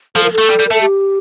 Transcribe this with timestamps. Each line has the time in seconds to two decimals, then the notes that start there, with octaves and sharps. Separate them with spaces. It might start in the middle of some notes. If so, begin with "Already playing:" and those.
0.16 F3 A4
0.24 A#4
0.33 A4
0.38 A3
0.48 G3
0.59 G3
0.67 A#4
0.71 A3 A4
0.81 G4